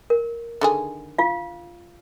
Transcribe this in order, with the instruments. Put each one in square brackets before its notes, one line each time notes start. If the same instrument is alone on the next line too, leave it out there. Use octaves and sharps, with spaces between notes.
[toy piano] A#4
[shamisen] D3 D#3 G#4
[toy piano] F4 F5